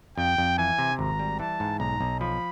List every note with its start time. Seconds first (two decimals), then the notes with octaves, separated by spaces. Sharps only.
0.18 F2 G5
0.38 F2
0.58 E3 G#5
0.79 C3
0.99 G#1 A#5
1.19 G3
1.40 E3 A5
1.60 G#2
1.80 B1 A#5
2.01 B1
2.20 F3 B5